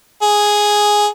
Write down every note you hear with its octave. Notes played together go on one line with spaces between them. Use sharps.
G#4